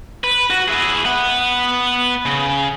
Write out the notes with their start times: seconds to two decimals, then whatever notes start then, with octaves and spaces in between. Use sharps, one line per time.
0.24 B4
0.50 F#4
0.68 E4 G#4
1.05 B3 F#5
2.26 C#3